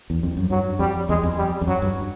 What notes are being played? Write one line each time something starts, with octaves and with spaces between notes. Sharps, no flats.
E2
F2
F#2
G2 F#3
F2 G3
E2 G#3
F2
G3
F2
F#2 F#3
G2